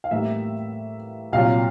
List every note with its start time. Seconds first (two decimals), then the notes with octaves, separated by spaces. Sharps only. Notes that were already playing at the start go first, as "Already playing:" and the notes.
0.04 F5
0.11 A2 E3 G3 A#3 E5
1.33 C2 A#2 F#3 F5